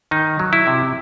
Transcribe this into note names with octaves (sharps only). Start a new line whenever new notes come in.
D#3 D#4
F#3
E4
C3